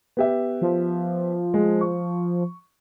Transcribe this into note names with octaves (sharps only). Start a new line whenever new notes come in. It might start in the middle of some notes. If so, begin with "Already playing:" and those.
B3 G4 E5
F3
G#3
C#6